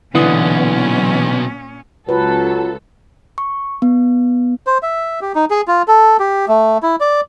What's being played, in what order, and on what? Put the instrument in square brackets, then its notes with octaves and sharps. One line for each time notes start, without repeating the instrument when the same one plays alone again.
[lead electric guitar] B1 B3 [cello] A#2 C#4 [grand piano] D3 D#6 [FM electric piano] E3
[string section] C#2 A4 [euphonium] F#3 [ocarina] F4 [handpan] B4
[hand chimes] C#6
B3
[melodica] C5
E5
G4
D#4
G#4
F4
A4
G4
A3
E4
D5